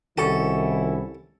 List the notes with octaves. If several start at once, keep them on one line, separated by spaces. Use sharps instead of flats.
C2 D#3 C#4 E4 F#4 A4